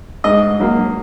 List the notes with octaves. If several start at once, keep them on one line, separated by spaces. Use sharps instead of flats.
G#2 D#5
F#3 A#3